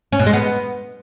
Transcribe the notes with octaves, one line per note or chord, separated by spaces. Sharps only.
C#4
B2
G#3
B3